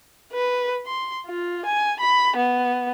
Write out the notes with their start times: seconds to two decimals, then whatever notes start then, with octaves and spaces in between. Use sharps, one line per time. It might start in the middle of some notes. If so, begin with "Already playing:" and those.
0.33 B4
0.86 C6
1.27 F4
1.65 G#5
2.00 B5
2.37 B3